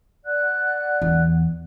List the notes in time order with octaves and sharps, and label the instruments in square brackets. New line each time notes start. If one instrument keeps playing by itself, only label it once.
[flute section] D5 F#5 F#6
[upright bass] E2